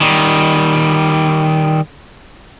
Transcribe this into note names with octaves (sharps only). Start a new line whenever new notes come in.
D#3 G3